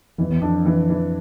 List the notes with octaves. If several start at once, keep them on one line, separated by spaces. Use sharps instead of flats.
F2 E3
E2
F2 D4
E3
E3